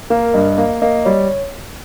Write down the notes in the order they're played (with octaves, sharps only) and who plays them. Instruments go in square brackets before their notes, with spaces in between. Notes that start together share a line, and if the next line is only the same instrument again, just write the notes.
[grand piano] A#3 [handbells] A#4
[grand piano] G2 [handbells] D#5
[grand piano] A#3
[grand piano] A#3 [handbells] D#5
[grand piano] G3 [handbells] C#5